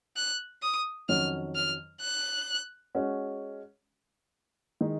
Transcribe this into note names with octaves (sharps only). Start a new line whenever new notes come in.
F#6
D#6
F2 D#3 F#3 C#4 F#4 F6
F6
F#6
G#3 C#4 F#4
D#3 G#3 D#4